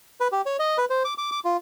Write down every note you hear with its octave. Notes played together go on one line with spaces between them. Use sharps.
B4
G4
C#5
D#5
B4
C5
D6
D6
D6
F4